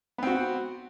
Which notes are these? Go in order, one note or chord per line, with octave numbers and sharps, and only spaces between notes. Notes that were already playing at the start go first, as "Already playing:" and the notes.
B3 C4 F#4